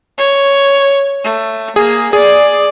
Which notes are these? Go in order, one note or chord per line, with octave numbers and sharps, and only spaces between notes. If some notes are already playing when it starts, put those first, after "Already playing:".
C#5
A3
A#3 G#4
G#4 D5